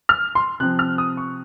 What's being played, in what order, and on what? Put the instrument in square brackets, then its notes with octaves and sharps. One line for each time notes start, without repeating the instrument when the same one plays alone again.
[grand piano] F6
C6
C3 F3 C4 F#6
F6
D#6
C#6